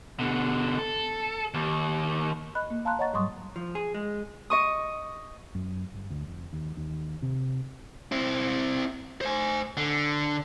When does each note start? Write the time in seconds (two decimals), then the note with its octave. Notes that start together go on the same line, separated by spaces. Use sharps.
0.19 B2 D3
0.78 A4
1.54 D#2
2.55 D#5 B5 F#6
2.70 A#3
2.85 F5 A5 A#5 C6 F#6
2.99 C#5 D#5 F#5 A#5 C#6 A6
3.13 G#2 F#3 G3 C6 C#6 D#6
3.56 F3
3.75 G#4
3.95 G#3
4.50 D#5 C#6 D#6
5.55 F#2
5.94 G1
6.10 D2
6.28 F1
6.52 D#2
6.77 D#2
7.22 C3
8.12 C4 E4
9.21 C5 G#5
9.77 D3